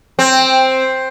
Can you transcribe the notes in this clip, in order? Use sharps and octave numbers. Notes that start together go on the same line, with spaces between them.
C4